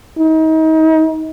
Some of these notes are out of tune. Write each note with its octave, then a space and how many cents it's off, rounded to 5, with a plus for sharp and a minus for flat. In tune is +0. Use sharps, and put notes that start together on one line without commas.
D#4 +35